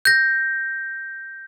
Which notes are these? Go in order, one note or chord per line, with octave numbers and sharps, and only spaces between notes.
G6 A#6